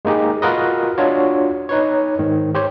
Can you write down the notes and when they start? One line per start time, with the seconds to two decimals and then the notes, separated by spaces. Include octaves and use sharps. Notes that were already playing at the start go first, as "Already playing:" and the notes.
0.05 G#3 A#3 D#4 G4 G#4
0.42 F4 F#4 A#4 B4 D#5
0.98 D4 F4 F#4 C#5
1.69 D#4 B4 C#5
2.19 G#2 D#3
2.55 G4 C5 C#5